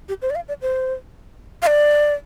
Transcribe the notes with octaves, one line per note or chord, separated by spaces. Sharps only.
G4
C5
D5
F5
D5
C5
F5
D5